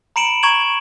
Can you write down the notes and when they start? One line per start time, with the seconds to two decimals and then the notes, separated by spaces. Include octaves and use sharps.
0.16 A#5 B5 C#7 D7 E7 F#7
0.43 A#5 C#6 G#6 E7 F#7